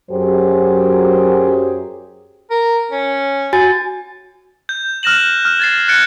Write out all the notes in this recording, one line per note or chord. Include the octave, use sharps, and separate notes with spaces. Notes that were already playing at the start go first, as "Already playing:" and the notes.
F#2 F#3 G4 G#4 C5
A#4
C#4
F#4 G#5 A6
G6
F6 F#6 A#6 E7 F#7
F6
F6 F#6
G#6 A6 C7
F#6 G#6 A6 C#7 D7 G7